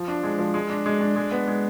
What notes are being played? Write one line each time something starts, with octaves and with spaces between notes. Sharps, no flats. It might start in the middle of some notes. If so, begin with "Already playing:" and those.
Already playing: F3
D4
G#3
F3
G#3
D4
G#3
D4
G#3
B3
G#3